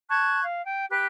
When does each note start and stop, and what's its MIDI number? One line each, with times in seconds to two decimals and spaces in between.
0.09 0.43 81
0.09 0.43 85
0.09 0.43 90
0.09 0.43 92
0.44 0.64 77
0.64 0.85 79
0.91 1.05 67
0.91 1.05 71
0.91 1.05 90